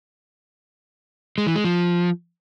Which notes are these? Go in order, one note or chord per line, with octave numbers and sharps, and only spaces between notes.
G#3
E3
G#3
F3